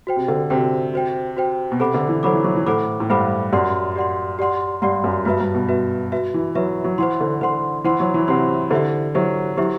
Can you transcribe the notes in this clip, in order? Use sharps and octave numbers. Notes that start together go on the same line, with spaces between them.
F#4 C5 G5
C3
D3
C3 F#4 C5 G5
F#4 C5 G5
F#4 C5 G5
B2
C3 A4 C5 F#5 B5 D6
D3
E3
F#3 A4 C5 F#5 B5 D6
E3
F#3
E3
A2 A4 C5 F#5 B5 D6
A2
G2 A4 C5 F#5 B5 D6
F#2 G4 D5 F#5 C6
G4 D5 F#5 C6
G4 D5 F#5 C6
G2 G4 D5 F#5 C6
F#2
G2 F#4 B4 E5
G2
B2
F#4 B4 E5
F#4 B4 E5
E3
F#3 F#4 B4 E5
F#3
E3 C5 F#5 C6
D3
D3 C5 F#5 C6
E3 C5 F#5 C6
F#3
E3
C3 C5 F#5 C6
D3 E4 G4 C5 E5
F#3 E4 G4 C5 E5
F#3 E4 G4 C5 E5